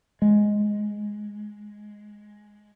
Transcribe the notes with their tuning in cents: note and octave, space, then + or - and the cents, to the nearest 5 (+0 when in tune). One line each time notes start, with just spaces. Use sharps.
G#3 +5